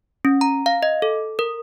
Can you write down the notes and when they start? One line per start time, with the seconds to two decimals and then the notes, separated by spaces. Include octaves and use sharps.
0.25 C#4
0.41 A#5
0.66 F5
0.83 D#5
1.02 A4
1.39 A#4